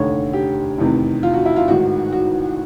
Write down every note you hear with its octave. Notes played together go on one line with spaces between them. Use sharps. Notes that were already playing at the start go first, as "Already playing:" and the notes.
Already playing: F1 D#2 D3 C#5
G4
F1 E2 C3 D#3
F4
F#4
E4
F4
A1 G#2 D#3 F#4
F#4